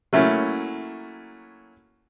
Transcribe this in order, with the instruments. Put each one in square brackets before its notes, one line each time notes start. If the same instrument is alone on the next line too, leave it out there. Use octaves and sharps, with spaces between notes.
[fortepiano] F#3 A3 A#3 C#4 E4